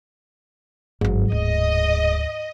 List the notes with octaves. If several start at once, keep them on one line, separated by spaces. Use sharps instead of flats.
G1 G#2 F#3
D1 D2 D#5